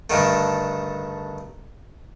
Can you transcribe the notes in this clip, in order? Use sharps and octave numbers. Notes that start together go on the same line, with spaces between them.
G2 D3 D#3 A3